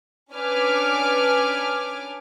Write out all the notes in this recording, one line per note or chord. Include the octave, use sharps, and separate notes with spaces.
C#4 D4 B4 G#5 D6 F6